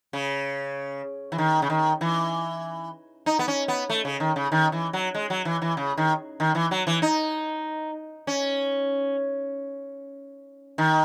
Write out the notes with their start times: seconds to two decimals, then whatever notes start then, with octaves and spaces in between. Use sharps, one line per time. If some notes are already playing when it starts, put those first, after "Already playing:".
0.13 C#3
1.32 E3
1.38 D#3
1.62 C#3
1.70 D#3
2.01 E3
3.26 D#4
3.39 B3
3.48 C#4
3.68 B3
3.90 A3
4.05 C#3
4.20 D#3
4.36 C#3
4.52 D#3
4.72 E3
4.93 F#3
5.14 G#3
5.30 F#3
5.45 E3
5.62 E3
5.77 C#3
5.97 D#3
6.40 D#3
6.55 E3
6.71 F#3
6.87 E3
7.02 D#4
8.27 C#4
10.78 D#3